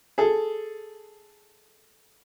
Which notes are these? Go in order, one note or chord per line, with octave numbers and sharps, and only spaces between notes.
G#4 A4